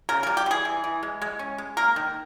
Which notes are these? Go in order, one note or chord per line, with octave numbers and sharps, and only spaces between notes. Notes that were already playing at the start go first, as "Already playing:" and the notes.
C#3 A#4
A#4
G3
G4
E3 G#4
E3
E3
G#3
G#3
C#4
G#3
A#3 A#4
D#3